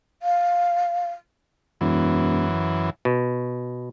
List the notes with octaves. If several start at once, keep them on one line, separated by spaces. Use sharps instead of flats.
F5
E1 F#2 E3
B2